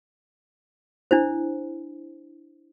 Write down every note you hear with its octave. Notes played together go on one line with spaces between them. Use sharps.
D4 E4 C5